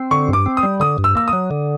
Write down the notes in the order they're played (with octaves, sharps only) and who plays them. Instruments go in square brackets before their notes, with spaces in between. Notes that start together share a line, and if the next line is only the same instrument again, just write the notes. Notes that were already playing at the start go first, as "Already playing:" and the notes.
Already playing: [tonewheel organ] C4
[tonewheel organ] D3 [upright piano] C#6
[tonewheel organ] G2
[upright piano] D6
[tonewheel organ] C4
[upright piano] D#6
[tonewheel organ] G3
[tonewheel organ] D3 [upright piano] D#6
[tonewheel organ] G2
[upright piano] E6
[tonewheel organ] A#3 [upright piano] E6
[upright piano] D#6
[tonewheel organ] F#3
D3